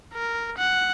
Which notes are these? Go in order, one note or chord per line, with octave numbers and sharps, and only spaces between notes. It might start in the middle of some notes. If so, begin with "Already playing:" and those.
A#4
F#5